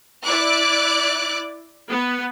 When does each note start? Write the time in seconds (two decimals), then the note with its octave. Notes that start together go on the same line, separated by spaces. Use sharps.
0.24 E4 D5 D6 F#6
1.90 B3